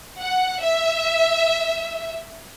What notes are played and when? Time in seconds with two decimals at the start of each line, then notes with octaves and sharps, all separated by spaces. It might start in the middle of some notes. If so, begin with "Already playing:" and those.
0.19 F#5
0.61 E5